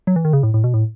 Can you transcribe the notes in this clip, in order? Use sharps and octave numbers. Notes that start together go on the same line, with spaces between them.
F#3
E3
D#3
C#3
A2
A2
B2
A2